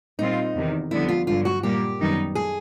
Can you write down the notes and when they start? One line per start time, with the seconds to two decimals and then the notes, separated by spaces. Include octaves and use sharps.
0.19 A#2 G3 C4 D#4 F4
0.55 E2 C3 D#3
0.91 F2 D3 G3 B3 E4
1.09 F4
1.27 G2 D3 F#3 F4
1.45 F#4
1.63 A#2 G3 A#3 G4
1.99 F#2 D#3 G3 B3 D#4
2.35 G#4